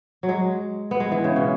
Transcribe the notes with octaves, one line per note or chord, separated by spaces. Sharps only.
F#3
G#3
B3
G#3
E3
C#3
B2